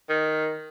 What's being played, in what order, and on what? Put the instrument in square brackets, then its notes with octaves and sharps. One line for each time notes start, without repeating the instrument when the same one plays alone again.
[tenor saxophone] D#3